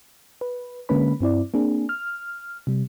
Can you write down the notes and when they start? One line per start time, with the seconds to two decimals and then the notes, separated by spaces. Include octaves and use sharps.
0.41 B4
0.89 D3 G#3 A#3 C#4 B4 B5
1.20 G2 C4 E4 D5
1.54 A#3 C4 D4 G#4
1.89 F6
2.67 C3 G3